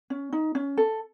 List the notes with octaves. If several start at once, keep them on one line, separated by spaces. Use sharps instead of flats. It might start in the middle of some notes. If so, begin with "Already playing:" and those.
C#4
D#4
C#4
A4